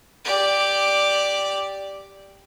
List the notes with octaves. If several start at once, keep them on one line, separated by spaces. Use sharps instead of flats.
G4 D5